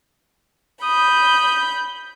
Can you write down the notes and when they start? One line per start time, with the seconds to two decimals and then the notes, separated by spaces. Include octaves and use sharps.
0.83 B5 D#6 G6